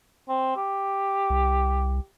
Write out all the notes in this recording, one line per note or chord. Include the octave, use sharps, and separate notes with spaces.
C4
G4
C2